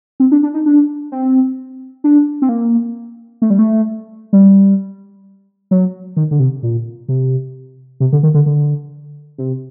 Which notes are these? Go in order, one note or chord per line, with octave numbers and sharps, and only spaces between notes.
C4
D4
D4
D#4
D4
C4
D4
C4
A#3
A3
G3
A3
G3
F#3
D#3
D3
C3
A#2
C3
C3
D3
D#3
D3
D3
C3